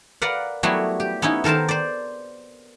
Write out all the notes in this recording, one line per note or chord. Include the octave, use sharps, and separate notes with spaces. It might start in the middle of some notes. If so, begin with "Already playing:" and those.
A#4 B4 D5 F5 F#5
F#3 G3 A3 B3 E4 F#4
G4
B3 C#4 D#4 E4
D#3 A4 A#4 C5 A5
C5 D5